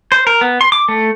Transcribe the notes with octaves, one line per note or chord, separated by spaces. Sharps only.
C5
A#4
B3
C6
D6
A3